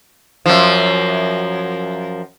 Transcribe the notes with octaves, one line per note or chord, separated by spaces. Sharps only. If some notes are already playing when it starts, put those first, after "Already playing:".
F#2 F3